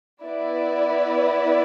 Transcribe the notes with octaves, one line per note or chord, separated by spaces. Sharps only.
B3 E4 B4 D5